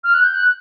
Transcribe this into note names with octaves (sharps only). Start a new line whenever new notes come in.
F6
F#6
G6
F#6